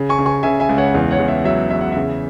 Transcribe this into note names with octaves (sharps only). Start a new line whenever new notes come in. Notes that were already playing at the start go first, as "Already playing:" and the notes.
Already playing: C#3
G#5 C#6
C#3
G#5 C#6
C#3 E5 G#5
E5 G#5
C#2
C#5 F#5
E2
C#5 F#5
E2
E5
F#3 E5
E2 E5
F#5
C#3 E5